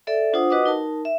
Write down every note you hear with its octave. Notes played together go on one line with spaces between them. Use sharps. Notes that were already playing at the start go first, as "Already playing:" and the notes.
A4 D5 E5
D4 F4 C5 F#5 D#6
F#4 B4 D#5 F#5 D6 D#6
D#4 A#4 A5
E5